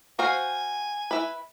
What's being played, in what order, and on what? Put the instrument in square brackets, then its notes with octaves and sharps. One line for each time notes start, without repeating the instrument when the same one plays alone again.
[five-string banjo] F#4 C5 F5 [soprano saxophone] G#5
[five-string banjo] E4 B4